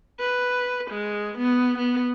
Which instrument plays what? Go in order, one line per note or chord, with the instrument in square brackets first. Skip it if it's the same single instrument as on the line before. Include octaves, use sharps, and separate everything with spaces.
[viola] B4
G#3
B3
B3